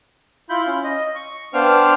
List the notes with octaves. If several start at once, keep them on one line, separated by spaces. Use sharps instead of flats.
E4 F4 B5 G6
C#4
D#5
C#6
B3 D4 C5 F5 G5 F6